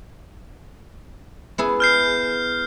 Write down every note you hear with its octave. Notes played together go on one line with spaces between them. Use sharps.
B3 E4 G#4
F6 G6 C7